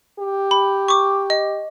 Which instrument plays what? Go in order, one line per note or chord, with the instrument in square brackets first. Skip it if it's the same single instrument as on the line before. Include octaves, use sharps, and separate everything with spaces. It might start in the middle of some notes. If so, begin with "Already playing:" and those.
[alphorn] G4
[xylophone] B5
C#6 D6
D#5